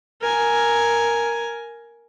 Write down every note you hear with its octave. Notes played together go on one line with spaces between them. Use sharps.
A#4 G#5